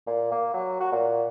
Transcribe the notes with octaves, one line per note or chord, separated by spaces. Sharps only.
A#2
A#3
F#3
F#4
A#2